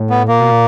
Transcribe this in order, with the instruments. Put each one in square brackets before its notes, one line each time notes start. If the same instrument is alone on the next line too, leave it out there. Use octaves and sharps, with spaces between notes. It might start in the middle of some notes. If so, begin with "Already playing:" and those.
Already playing: [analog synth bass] A2
[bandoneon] B3
[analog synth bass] A#2 [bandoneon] A#3
[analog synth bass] B2
A#2